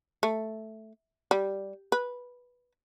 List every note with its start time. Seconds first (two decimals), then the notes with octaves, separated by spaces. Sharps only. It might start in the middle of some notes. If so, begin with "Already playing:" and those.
0.23 A3
1.31 G3
1.92 B4